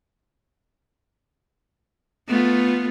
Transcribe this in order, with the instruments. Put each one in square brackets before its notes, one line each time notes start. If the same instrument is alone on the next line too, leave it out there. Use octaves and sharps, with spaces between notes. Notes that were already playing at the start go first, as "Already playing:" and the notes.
[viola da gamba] A3 B3 F4